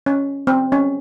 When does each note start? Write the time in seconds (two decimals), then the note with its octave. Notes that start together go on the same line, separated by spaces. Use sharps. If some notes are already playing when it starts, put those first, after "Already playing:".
0.06 C#4
0.47 C4
0.72 C#4